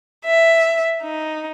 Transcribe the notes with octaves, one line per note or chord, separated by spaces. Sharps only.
E5
D#4